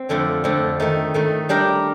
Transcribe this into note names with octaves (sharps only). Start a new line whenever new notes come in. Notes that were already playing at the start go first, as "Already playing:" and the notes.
Already playing: C4
F2 D3 F3 A3
F2 D3 F3 A3
D#3 A3 D#4
D#3 A3 D#4
G3 D4 G4 A#4